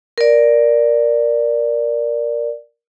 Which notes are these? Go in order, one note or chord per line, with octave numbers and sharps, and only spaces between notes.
A#4 D5